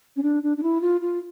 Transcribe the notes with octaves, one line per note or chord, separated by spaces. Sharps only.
C#4
D4
D4
D4
E4
F4
F4